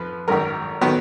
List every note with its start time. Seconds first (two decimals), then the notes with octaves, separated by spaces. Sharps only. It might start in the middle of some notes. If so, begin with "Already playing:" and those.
Already playing: F2 F3 B4
0.28 G#1 F#2 D#3 A#4
0.81 D#3 F#3 B3